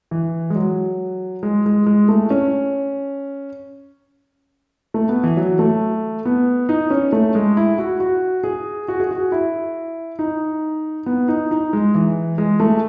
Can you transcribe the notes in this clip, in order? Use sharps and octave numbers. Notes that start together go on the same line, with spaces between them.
E3
G#3
F#3
G#3
G#3
G#3
A3
C#4
A3
B3
E3
F#3
A3
B3
D#4
C#4
A3
G#3
E4
F#4
F#4
G#4
F#4
G#4
F#4
E4
D#4
B3
D#4
D#4
G#3
E3
G#3
A3